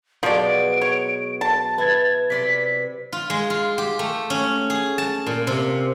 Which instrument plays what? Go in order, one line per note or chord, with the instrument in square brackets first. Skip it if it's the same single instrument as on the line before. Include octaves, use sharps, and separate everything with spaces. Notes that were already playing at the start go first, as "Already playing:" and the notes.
[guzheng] B2 F#3 G#3 [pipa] F3 D5 [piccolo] D7
[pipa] C#5
[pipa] A5 [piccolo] A6
[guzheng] E4 [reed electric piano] B4 G#6
[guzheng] C3 D5 C6 [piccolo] B6
[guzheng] F4
G#3
F4
G4
A3
C#4
G#4
A5
A#2
C3